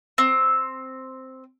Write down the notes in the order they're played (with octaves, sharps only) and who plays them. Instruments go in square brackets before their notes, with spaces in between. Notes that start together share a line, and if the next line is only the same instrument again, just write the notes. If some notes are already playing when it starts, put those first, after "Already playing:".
[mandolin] C4